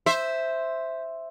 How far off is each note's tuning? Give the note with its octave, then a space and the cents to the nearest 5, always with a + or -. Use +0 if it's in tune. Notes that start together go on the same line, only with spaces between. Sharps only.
C5 +0 E5 +0